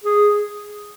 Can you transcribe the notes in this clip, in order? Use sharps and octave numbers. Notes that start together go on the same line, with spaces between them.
G#4